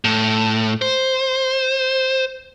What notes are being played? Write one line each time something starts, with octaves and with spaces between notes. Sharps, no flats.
A2
C5